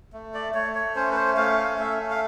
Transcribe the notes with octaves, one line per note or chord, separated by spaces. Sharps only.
A3
D5
A3 C#5
C#5
C#4 C5
B4
C5
A3 F5
F5
A3 E5
F5